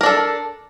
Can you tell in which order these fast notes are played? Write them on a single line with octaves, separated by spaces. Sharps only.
A#4 D4 A4